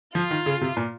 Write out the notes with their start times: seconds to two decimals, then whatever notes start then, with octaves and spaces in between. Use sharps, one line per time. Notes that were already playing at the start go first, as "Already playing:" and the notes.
0.15 F3 F4
0.31 D#3
0.46 C#3
0.61 C3
0.77 A#2